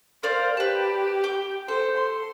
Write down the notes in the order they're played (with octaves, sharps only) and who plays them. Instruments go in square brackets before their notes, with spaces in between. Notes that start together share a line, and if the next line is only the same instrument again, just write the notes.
[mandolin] A#4 D5 F5 [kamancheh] C5
[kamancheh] G4 [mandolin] B4 A5
[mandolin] G5 D6
[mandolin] A4 [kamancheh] C5
[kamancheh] C6